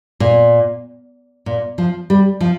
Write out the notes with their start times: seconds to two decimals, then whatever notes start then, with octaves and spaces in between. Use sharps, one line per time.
0.20 A#2
1.46 A#2
1.78 F3
2.10 G3
2.41 F3